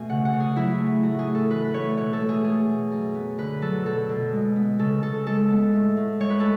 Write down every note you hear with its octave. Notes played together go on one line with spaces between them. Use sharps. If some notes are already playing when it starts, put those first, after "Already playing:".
Already playing: B2 A3 G#5
C#3 F#5
F#5
C#3
G#4
F#3 E4
A3
A2 F#4
G#4
A2
A4
E3 B4
B4
A3 C#5
B2 C#5
A4
A3
G#4
A3 G#4
B2
F#2
B3
D3 B4
F#3 A4
B2 A4
B2
G#3
B3
C#3 A4
C#3 A4
G#3 A4
B3
A2
A2
G#3 C#5
B4
A4